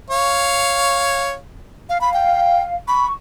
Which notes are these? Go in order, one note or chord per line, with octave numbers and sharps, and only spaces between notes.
C#5 F5
F5
F5 B5
G5
B5 C#6